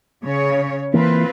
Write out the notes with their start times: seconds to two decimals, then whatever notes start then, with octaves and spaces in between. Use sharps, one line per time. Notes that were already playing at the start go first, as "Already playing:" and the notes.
0.22 C#3 C#5
0.94 E3 A#3 C4 F4 B4